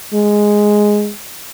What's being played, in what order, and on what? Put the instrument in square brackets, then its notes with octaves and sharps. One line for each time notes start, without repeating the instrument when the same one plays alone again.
[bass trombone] G#3